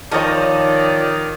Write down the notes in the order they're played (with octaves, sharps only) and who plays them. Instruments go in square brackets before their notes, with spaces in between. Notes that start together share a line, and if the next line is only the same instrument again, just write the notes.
[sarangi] D#3 [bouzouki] F3 C#5 [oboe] D5